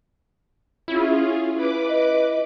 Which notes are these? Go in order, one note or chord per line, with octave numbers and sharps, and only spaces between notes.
C#4 E4 F4 G#4
B4 D6
D#5